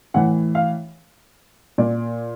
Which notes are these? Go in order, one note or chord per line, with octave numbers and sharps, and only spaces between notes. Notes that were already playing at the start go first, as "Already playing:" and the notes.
A2 E3 F#5
F5
A#2 D5